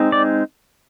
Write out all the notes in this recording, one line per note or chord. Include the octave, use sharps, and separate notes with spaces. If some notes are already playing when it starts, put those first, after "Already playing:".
Already playing: G#3 C4 D#4
D5